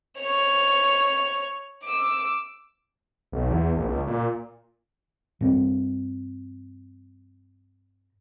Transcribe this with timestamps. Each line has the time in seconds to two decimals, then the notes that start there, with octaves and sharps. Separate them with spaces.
0.19 C#5 F7
1.84 D6 E6
3.32 B1
3.50 E2
3.76 A#1
3.88 C#2
4.07 A#2
5.41 G2 C4